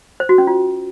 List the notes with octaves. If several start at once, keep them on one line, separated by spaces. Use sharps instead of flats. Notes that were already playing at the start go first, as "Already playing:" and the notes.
C5
F#4
C#4
F4